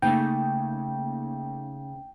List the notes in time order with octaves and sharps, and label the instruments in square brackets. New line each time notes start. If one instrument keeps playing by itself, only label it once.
[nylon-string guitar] C#3 [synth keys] A3 A#3 D#4 [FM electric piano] G5